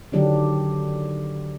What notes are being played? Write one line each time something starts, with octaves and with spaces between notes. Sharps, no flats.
D3 D#3 F#3 D4 G4